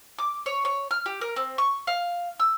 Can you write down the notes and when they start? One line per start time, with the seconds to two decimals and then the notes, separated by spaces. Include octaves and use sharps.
0.19 D6
0.46 C#5
0.65 C#5
0.91 F6
1.06 G4
1.21 A#4
1.36 C4
1.58 C#6
1.87 F5
2.40 E6